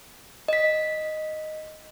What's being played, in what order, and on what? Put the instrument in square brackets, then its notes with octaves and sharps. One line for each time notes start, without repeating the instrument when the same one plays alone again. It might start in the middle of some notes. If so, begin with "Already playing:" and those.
[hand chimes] D#5 B6